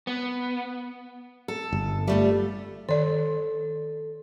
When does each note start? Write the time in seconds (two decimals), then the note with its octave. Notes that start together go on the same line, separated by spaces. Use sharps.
0.07 B3
1.48 A4
1.72 G1
2.07 G3 A3 F4
2.89 D#3 A4 D5